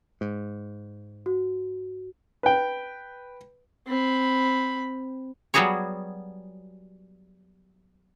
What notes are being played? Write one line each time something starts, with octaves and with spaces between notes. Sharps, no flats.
G#2
F#4
B4 G5
C4 B5
F#3 G3 B3 F#4 G#4 C#5